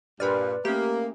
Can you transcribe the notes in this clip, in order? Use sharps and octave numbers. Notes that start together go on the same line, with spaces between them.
G2 A#2 B4 D5 B5 C6 F6
A3 A#3 C#4 G4